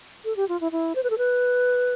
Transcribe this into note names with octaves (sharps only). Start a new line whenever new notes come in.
A4
G4
F4
E4
E4
C5
B4
A4
B4